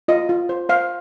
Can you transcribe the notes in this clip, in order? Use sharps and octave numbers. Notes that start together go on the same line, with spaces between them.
F4 D#5
F4
C5
C5 F5